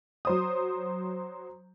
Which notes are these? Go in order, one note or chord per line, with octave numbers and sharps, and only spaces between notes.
F#3 C5 D#6